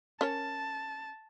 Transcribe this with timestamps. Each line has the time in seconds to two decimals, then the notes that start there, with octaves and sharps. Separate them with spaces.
0.21 C#4 A#4 C#5 A5